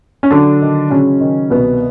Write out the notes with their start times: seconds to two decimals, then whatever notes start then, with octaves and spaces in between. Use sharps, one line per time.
0.23 C#4
0.31 D3 F#3 D4
0.62 D#3
0.90 C#3 F#3 C#4
1.20 D#3
1.50 C2 B2 B3